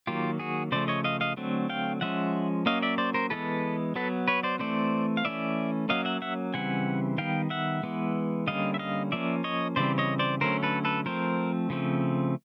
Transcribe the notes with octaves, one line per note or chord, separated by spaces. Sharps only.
D#3 F#3 A#3 F4 G4
F#4 G#4
C#3 F3 A3 C5 D5
C#5 D#5
D#5 F5
D#5 F5
D3 F#3 A3 C4
F5 G5
F3 G#3 C#4 E5 F#5
F#3 A#3 C#4 D#5 F5
D5 E5
C5 D5
A#4 C5
E3 G#3 B3 A4 B4
F#3 B3 A4 B4
B4 C#5
C5 D5
E3 A3 C4 C5 D5
F5
E3 A3 C#4 D5 E5
F#3 A#3 C#4 D#5 F5
E5 F#5
E5 F#5
C#3 E3 G3 C4 F#5 G#5
D#3 G3 B3 F5 G5
E5 F#5
E3 G#3 B3
D3 G3 A#3 C#4 D#5 F5
E5
D#5 F5
F3 A#3 C#4 D5 E5
C#5 D#5
C#3 E3 G3 C4 C5 D5
C#5 D#5
C5 D5
D3 F#3 A3 C#4 A#4 C5
A4 B4
A4 B4
F3 A3 C4 A#4 C5
C#3 F3 A3 C4